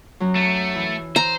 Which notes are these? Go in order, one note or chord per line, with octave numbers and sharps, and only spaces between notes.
F#2 F#3
A3
E3
C5 A#5